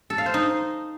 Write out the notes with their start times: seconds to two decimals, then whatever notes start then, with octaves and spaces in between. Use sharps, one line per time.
0.10 A4
0.18 F5
0.26 C5
0.34 D#4